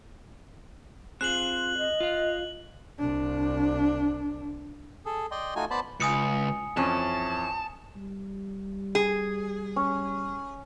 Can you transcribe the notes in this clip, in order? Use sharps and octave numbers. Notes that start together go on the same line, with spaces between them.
C4 F4 G#4 F#6 F#7
D#5
F4 F5
C2 D4
G#4 A4
D5 D#5 G5 C6
A3 D#4 F4 F#4 G#5
B3 C5 D5 A5 B5
C#2 G#5 D#6 C#7
F2 E3 C#4 A5
G3
G#4
C#4